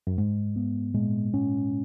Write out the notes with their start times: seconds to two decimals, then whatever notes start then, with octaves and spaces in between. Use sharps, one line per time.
0.07 F#2
0.18 G#2 G#3
0.56 B3
0.94 A#2 G#3
1.34 C#4